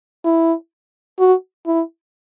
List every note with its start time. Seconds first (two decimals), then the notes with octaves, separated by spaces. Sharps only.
0.24 E4
1.19 F#4
1.66 E4